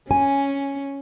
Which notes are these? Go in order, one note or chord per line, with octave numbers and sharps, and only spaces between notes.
C#4 G#5